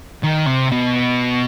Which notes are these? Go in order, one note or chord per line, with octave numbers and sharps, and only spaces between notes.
D#3
C3
B2